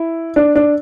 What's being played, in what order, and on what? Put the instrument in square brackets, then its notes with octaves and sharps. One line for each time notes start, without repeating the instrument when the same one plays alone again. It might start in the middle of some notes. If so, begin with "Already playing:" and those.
Already playing: [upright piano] E4
D4
D4